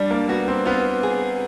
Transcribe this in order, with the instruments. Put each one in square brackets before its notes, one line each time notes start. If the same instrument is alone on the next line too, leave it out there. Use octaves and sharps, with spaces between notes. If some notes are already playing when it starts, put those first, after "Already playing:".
Already playing: [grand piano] G3 [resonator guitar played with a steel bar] D4
[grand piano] A#3
[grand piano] B3 [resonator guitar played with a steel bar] F#4
[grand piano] C4
[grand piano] B3 [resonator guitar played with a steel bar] F4
[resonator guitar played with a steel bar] G#4